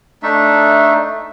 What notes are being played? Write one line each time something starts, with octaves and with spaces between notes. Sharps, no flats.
A3 D4 D#4 E5